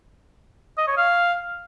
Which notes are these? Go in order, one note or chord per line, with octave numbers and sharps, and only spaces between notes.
D#5
C#5
F5